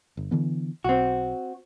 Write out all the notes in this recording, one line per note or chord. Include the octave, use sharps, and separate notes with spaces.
G1
D3 E3 B3
B1 C4 F#4